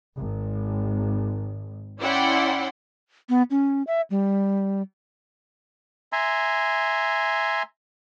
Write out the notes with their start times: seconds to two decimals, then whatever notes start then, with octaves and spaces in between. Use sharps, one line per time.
0.17 G#1
2.00 C#4 E4 D5 F#5 G5 C6
3.29 B3
3.51 C#4
3.87 E5
4.10 G3
6.13 E5 G#5 A#5 C6